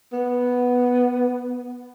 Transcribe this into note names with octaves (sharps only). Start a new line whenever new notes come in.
B3